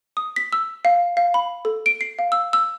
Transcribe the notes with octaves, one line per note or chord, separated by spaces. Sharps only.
D#6
B6
E6
F5
F5
B5
A4
D7
C7
F5
E6
E6